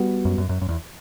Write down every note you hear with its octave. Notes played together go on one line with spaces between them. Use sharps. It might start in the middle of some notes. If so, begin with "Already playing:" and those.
Already playing: G3 B3 F#4
F#2
F#2
F#2
F#2
E2